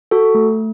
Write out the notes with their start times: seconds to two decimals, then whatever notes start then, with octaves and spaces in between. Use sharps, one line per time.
0.11 F#4 A4
0.34 A3